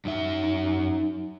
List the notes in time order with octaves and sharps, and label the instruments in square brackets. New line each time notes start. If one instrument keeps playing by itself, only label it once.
[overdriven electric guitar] F#2 E5 [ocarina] D#4